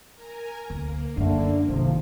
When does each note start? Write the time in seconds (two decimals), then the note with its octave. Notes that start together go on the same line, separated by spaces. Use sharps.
0.13 A#4 G#5 A#5
0.70 D2 A#3
1.17 F#2 D3 A3 D4
1.68 G1 C2 C3 D#3 F3